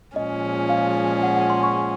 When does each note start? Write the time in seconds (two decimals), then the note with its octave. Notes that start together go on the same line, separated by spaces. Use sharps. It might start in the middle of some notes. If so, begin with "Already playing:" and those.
0.16 A#2 F3 G#3 C#4 G#4 D#5
0.69 F5
1.23 F#5
1.36 F#5
1.50 C6
1.63 C#6